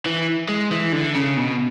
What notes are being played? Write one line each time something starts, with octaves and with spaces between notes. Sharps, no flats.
E3
G#3
E3
D3
C#3
B2